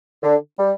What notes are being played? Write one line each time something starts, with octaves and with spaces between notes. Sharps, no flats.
D3
G3